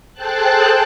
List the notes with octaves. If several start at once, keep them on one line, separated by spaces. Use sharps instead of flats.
G#4 A4 C5 G5 A5 F#6